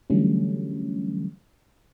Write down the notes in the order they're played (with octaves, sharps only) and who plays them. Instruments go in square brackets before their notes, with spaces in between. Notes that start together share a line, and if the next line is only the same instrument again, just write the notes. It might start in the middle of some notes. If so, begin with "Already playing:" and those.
[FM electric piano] D3 E3 F#3 G3 A3 C#4